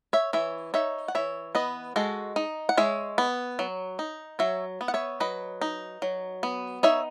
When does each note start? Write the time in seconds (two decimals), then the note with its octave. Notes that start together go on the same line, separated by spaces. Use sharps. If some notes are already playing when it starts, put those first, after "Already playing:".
0.13 C#5 E5
0.33 E3 C#5 E5
0.74 D#4 C#5 E5
1.08 F#5
1.15 E3 C#5 E5
1.55 B3 B4 D#5
1.96 G#3 F#4 A4
2.36 D#4
2.69 F#5
2.77 G#3 C#5 E5
3.18 B3
3.59 F#3
3.99 D#4
4.39 F#3 C#5 E5
4.81 B3
4.88 F#5
4.94 C#5 E5
5.20 F#3 B4 D#5
5.61 D#4
6.02 F#3
6.43 B3
6.83 D#4 C#5 E5